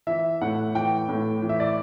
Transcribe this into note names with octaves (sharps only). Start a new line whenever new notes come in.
E3 E5
A2 F#5
E3 G5
A2
E3
E5
D5